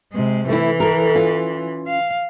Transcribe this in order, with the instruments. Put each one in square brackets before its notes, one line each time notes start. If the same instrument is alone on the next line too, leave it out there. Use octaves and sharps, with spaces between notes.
[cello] C3 G#3
[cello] E3 [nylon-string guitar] A3 E4
[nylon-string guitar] A4 A#4
C#4 F4
[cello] F5